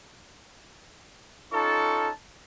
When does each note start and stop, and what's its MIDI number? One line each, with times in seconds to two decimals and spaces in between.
1.53 2.10 61
1.53 2.10 63
1.53 2.10 65
1.53 2.10 69
1.53 2.10 81
1.53 2.10 85